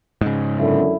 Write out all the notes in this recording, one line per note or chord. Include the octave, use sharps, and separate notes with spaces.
G#2 C#3
F#2 D3 E4